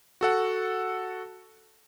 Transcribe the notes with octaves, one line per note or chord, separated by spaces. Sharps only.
F#4 A4 F#5